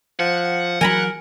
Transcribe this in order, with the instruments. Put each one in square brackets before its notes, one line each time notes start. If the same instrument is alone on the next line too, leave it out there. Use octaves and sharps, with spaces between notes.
[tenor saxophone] F3 [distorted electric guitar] F#5
[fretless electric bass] E3 F#3 [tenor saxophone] A#4 [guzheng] G#5 A#5 B5